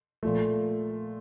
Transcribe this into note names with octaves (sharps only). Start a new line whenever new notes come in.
A#2 F3 A3